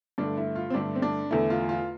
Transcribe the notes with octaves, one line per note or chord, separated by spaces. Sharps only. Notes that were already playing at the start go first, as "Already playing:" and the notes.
G2 D3 A3 D4
E4
F4
C4
G2 D3 A3 D4
C4
D4
E2 D3 A3 E4
F4
F4